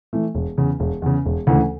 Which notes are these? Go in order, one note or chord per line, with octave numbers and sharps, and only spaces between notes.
E3 A3
E1
E2 C#3
E1
E2 C#3
E1
D2 C#3 E3 A3